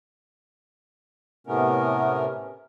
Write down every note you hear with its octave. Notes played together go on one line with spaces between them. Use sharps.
A2 C3 A3 B3 C#4 A#4